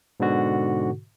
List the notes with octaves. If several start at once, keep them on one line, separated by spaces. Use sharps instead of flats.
G#2 B2 D3 F#4